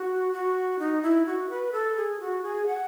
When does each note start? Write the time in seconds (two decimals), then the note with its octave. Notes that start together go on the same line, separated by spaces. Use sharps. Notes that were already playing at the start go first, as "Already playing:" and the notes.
Already playing: F#4
0.33 F#4
0.79 D#4
1.02 E4
1.26 F#4
1.50 B4
1.72 A4
1.96 G#4
2.20 F#4
2.43 G#4
2.66 F#5